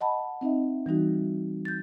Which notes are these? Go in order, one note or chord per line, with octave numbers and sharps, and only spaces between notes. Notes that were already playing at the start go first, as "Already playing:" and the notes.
D#5 F#5 A5 B5
C4 D#4 D#5 E5
E3 G3 D#4 F#4
G6 A6